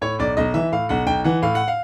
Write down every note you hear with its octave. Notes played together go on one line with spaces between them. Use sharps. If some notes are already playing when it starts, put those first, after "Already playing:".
A2 C#5
B1 D5
B1 D#5
E3 E5
A2 F5
B1 F#5
B1 G5
E3 F#5
A2 F5
F#5
F5